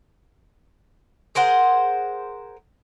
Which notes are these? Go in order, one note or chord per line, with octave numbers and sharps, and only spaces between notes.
G#4 A#4 C5 F#5